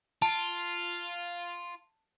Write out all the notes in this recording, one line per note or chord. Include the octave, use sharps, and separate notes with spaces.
F4 A5